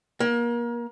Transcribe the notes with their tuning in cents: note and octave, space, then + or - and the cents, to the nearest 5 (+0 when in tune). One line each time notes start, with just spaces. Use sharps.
A#3 +30